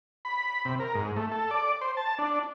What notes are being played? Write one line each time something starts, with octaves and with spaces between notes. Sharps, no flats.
B5
C3
A#4
G#2
A3
A4
D5
C5
A5
D4